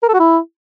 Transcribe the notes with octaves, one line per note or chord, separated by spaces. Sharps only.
A#4
A4
F#4
E4